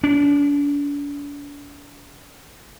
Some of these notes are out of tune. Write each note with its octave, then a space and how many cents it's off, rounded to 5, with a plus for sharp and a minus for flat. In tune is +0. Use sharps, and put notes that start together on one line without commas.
D4 -40